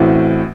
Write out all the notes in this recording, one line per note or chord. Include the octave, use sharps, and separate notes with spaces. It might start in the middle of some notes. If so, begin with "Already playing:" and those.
Already playing: A1 A2 E3 C4 F#4